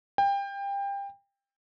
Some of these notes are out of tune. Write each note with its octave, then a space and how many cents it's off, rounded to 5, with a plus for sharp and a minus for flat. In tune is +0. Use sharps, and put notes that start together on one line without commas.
G5 +25